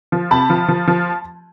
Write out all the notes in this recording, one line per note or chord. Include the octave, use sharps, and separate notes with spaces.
F3
C3 A5 B5
F3
F3
F3